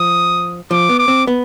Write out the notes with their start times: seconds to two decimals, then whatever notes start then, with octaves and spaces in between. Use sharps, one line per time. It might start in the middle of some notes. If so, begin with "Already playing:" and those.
Already playing: F3 D#6
0.71 F3 D6
0.89 B3
0.99 D6
1.08 C4
1.27 B3